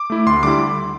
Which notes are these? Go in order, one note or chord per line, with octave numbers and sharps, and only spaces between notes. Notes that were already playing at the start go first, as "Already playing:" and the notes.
Already playing: D6
A3 E4
D2 C6
D3 G3 E4 D6